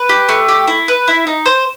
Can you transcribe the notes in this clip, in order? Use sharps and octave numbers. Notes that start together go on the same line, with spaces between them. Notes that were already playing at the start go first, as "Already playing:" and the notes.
Already playing: B4
G4
A3
G4
E4
B4
E4
D#4
C5